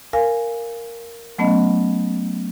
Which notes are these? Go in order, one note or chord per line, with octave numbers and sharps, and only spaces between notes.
A#4 F5 G#5
F#3 A3 B3 C#4 D#5